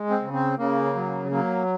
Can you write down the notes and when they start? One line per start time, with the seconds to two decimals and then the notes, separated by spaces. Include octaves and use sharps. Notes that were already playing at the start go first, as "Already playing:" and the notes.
Already playing: G#3
0.10 C4
0.22 C#3
0.33 C4
0.58 C#3 A#3
0.95 F#3
1.30 F#3 A#3